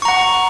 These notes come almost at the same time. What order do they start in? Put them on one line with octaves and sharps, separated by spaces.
C#6 A#5 F#5